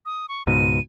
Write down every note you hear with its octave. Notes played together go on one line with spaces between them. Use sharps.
D#6
C#6
C#2 G#2 B2 D#7